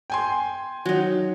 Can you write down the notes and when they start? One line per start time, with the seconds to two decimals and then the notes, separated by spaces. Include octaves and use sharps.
0.10 G5 G#5 C6
0.86 F#3 D#4